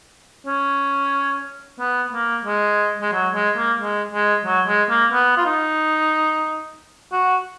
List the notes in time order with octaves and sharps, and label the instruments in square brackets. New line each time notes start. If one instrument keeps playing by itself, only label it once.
[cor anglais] C#4
B3
A#3
G#3
G#3
F#3
G#3
A#3
G#3
G#3
F#3
G#3
A#3
B3
F4
D#4
F#4